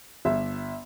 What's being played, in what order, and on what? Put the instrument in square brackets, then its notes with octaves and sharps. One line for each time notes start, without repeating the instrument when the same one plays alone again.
[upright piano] G1 E5